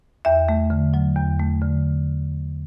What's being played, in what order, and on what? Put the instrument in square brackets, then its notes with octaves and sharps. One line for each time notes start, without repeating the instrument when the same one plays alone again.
[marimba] E2 E5
A3
D3
F#3
E2
A3
D3